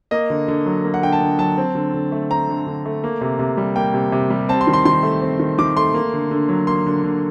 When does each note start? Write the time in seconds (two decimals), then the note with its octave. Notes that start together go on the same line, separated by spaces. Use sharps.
0.11 A#3 D#5
0.30 D3
0.48 D3
0.66 F#3
0.85 A#3
0.94 F#5
1.03 D3 G5
1.12 A5
1.21 D3
1.39 F#3 A5
1.58 C4
1.75 D3
1.94 D3
2.12 A3
2.30 C4 A#5
2.49 D3
2.67 D3
2.86 A3
3.04 A#3
3.21 C3
3.39 C3
3.57 G3
3.76 A#3 G5
3.94 C3
4.12 C3
4.30 G3
4.49 C4 A5
4.61 C6
4.67 D#3
4.73 C6
4.85 D#3 C6
5.03 A3
5.22 C4
5.39 D#3
5.58 D#3 D6
5.77 A3 C6
5.94 A#3
6.13 D3
6.31 D3
6.49 F#3
6.67 A#3 C6
6.86 D3
7.04 D3